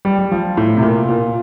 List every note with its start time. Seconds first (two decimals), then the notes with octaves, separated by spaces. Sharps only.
0.05 G3
0.19 G3
0.32 F3
0.57 A2
0.77 C3
0.83 A#2
1.09 A#2